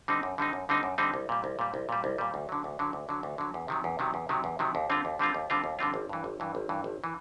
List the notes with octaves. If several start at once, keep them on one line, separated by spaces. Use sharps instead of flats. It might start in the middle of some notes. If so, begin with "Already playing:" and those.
D3 G3 C4 D#4
F#2
D3 G3 C4 D#4
F#2
D3 G3 C4 D#4
F#2
D3 G3 C4 D#4
C2
A#2 G3
C2
A#2 G3
C2
A#2 G3
C2
A#2 G3
D2
D3 F#3
D2
D3 F#3
D2
D3 F#3
D2
D3 F#3
E2
C3 D#3 F#3
E2
C3 D#3 F#3
E2
C3 D#3 F#3
E2
C3 D#3 F#3
D#2
D3 G3 C4 F4
D#2
D3 G3 C4 F4
D#2
D3 G3 C4 F4
D#2
D3 G3 C4 F4
G#1
G2 E3
G#1
G2 E3
G#1
G2 E3
G#1
E3